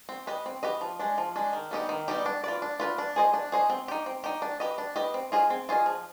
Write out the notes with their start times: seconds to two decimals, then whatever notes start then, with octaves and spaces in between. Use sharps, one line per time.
0.09 C4
0.27 G4 B4 D#5
0.46 C4
0.63 G4 B4 D#5
0.81 F3
0.99 G#3 D4
1.18 F3
1.36 G#3 D4
1.53 D#3
1.71 G3 B3 D#4 G4
1.89 D#3
2.08 G3 B3 D#4 G4
2.26 D4
2.44 F4 B4 D5
2.62 D4
2.80 F4 B4 D5
2.98 D4
3.16 G#4 C5 D#5
3.33 D4
3.52 G#4 C5 D#5
3.70 C4
3.88 D#4 G4
4.06 C4
4.24 D#4 G4
4.42 D4
4.60 G4 B4 D#5
4.78 D4
4.96 G4 B4 D#5
5.14 C4
5.32 F4 G#4 C5 D#5
5.50 C4
5.69 F4 G#4 C5 D#5
5.86 F3